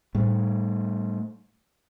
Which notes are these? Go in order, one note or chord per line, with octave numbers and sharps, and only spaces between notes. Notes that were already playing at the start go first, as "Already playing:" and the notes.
A2 G3 A3